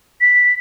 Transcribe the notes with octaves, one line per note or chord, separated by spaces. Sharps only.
B6